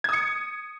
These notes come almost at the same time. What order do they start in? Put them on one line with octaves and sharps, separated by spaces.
G#6 D#6 C#7